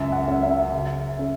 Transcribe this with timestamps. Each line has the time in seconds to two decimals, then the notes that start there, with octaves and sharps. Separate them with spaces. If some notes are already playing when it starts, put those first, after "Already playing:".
Already playing: C#2 F#2 E5
0.12 F#5
0.28 C#4
0.43 E5
0.73 C#3
1.19 C#4